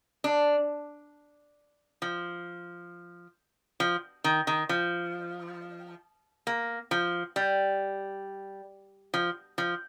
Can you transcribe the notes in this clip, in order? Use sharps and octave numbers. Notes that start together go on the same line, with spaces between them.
D4
F3
F3
D#3
D#3
F3
A#3
F3
G3
F3
F3